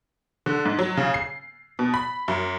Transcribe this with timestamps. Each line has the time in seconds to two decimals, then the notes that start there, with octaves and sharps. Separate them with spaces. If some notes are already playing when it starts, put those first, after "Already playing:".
0.46 D3
0.65 G#2
0.79 F#3
0.97 C#3
1.14 C7
1.79 B2
1.94 B5
2.28 F#2